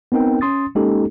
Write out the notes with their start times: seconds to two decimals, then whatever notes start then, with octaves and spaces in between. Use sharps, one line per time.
0.12 B3 C4 D#4 A#4 G5
0.41 C#4 C6 D#6 A6
0.75 G#3 A#3 C#4 D#4 G4 A4